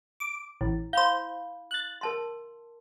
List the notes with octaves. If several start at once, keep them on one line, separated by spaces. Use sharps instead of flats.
D6
A1 E4
C5 F5 B5 G6
F#6 A6
A#4 A5 C6